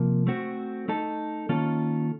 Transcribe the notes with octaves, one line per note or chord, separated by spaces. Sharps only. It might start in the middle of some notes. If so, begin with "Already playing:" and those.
Already playing: C3 F3 A#3
A3 C4 F#4
A3 D#4 A4
D#3 A#3 C#4 F4 A4